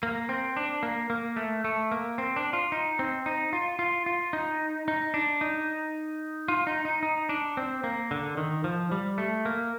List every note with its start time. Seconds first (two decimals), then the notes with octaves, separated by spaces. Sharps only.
0.03 A#3
0.29 C4
0.57 D4
0.83 A#3
1.10 A#3
1.36 A3
1.64 A3
1.92 A#3
2.18 C4
2.36 D4
2.53 F4
2.72 D#4
2.99 C4
3.26 D#4
3.53 F4
3.79 F4
4.06 F4
4.33 D#4
4.88 D#4
5.14 D4
5.41 D#4
6.48 F4
6.67 D#4
6.85 D#4
7.03 D#4
7.29 D4
7.57 C4
7.84 A#3
8.11 D3
8.37 D#3
8.64 F3
8.92 G3
9.18 A3
9.45 A#3